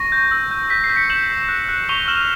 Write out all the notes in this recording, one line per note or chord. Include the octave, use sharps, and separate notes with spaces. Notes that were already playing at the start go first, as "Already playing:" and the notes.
Already playing: C#6 A#6
G6
E6
G6
G6 B6
C7
G6
B6 C#7
G6 E7 F#7
G6
F#6
F#6
C#6 F7 G7
F6 E7 F#7